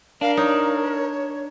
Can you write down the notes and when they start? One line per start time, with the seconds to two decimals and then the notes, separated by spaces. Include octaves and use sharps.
0.21 D4 A#4 F5
0.37 D#4 C#5